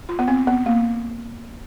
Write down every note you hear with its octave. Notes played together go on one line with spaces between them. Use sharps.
F4
B3
C4
B3
A#3